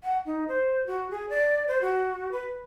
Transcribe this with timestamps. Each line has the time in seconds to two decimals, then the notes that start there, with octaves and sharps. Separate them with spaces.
0.03 F#5
0.26 D#4
0.48 C5
0.87 F#4
1.11 G#4
1.29 D5
1.68 C5
1.81 F#4
2.32 B4